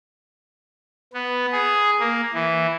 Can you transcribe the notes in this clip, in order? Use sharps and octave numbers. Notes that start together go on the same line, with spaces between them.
B3
G#4
A#3
E3